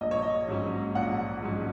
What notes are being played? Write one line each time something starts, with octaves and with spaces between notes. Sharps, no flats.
A#1 D#5
C#5
D#5
G#2 F#3 C#4
A#1 F#5
G#2 F#3 C#4